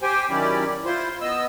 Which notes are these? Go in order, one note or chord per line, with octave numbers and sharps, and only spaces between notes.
G4 C5 G5 G#5
D#3 F#3 C#4 E4 G4 D5
E4 F4 C5 C6
B3 D#5 E6